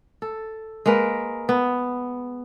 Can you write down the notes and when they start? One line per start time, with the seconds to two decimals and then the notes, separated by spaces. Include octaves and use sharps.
0.22 A4
0.86 G#3 A#3 A#4 B4
1.49 B3